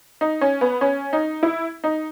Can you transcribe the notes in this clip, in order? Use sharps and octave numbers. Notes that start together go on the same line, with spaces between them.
D#4
C#4
B3
C#4
D#4
E4
D#4